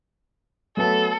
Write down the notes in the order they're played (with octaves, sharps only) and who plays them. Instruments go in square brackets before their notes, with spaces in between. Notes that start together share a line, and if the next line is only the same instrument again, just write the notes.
[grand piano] F#3 A3 B3 [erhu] A4